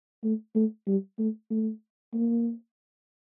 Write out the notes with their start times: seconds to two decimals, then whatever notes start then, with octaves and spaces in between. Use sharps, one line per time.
0.24 A3
0.55 A3
0.87 G3
1.19 A3
1.50 A3
2.14 A#3